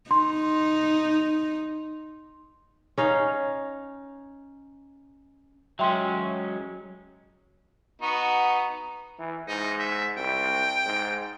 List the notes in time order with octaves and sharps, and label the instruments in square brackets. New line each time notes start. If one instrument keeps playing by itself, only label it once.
[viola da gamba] D#4 [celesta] C6
[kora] C#4 D#4 F5
[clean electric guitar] F#3 G#3 C#4 [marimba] E5 G5 C6
[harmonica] B3 D#4 F#4
[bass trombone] E3
[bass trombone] G#2 [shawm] D#4
[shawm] E5
[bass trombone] C2 [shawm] G5
[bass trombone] G#2